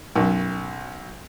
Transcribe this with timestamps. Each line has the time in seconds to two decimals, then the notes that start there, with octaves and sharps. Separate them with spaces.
0.16 B1 F#2